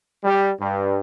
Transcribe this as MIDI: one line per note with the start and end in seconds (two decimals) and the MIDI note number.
0.24 0.51 55
0.60 1.00 43